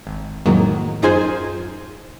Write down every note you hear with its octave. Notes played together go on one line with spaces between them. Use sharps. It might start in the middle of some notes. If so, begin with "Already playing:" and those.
G#1
F2 A2 D#3 F#3 G#3 A#3
F#2 D#4 F4 G#4 C5 G#5